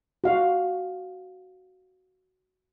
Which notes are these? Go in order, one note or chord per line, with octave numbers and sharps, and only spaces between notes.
F#4 F5